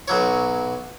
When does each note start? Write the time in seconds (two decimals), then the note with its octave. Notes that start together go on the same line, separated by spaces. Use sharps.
0.08 B1 F#3 C#5